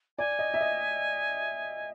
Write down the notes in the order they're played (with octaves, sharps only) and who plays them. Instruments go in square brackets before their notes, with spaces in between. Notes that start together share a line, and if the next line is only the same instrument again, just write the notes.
[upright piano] D5 [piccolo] G#5
[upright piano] D#5
E5
D#5